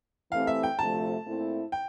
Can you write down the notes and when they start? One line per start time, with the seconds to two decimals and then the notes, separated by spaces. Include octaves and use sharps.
0.32 E3 A3 C4 G4 F5
0.47 E5
0.63 G5
0.79 D2 C3 F3 A3 A5
1.25 A#2 A3 C4 E4
1.72 G5